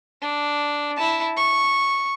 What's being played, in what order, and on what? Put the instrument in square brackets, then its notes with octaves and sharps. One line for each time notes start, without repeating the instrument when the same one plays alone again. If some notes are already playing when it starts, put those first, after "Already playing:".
[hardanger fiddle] D4
E4 A5
C#6